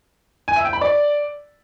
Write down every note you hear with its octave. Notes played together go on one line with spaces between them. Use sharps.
G#5
E5
G5
B5
D5